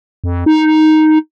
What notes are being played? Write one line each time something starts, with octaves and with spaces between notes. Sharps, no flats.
F2
D#4